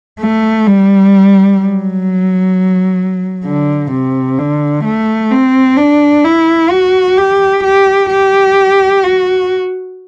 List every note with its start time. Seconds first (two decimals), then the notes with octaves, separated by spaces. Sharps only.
0.20 A3
0.66 G3
1.59 F#3
3.46 D3
3.92 C3
4.39 D3
4.85 A3
5.31 C4
5.78 D4
6.25 E4
6.71 F#4
7.18 G4
7.64 G4
8.11 G4
9.04 F#4